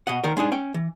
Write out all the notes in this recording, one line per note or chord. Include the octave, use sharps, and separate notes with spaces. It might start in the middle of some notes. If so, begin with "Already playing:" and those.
B2 D#5 F#5
D2 D#3 A#4
G#3 D4 D#4 G#4
C#4 G5
E3